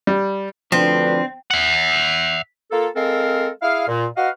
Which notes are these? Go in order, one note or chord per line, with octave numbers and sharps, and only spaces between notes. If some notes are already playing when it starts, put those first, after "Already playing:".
G3
D2 F3 C4 D4 B4
E5 F#5
A#3 F4 A4
G#3 C4 A4 A#4 F5
E4 G#4 F5
A#2
F#4 B4 D#5 F5